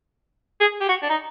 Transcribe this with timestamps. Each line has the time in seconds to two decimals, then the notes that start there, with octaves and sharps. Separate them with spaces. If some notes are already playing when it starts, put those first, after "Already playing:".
0.61 G#4
0.81 G4
0.89 F#4
1.02 D4
1.10 D#4